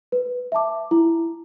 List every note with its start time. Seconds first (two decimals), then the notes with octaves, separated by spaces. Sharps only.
0.12 B4
0.52 E5 A5 D6
0.91 E4